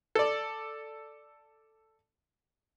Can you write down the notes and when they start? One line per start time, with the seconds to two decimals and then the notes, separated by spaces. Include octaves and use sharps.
0.15 A4 D5